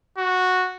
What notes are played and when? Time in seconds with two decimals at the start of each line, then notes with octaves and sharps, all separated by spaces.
0.18 F#4